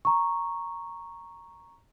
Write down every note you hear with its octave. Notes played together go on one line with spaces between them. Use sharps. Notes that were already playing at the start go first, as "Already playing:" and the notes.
A#5 C#6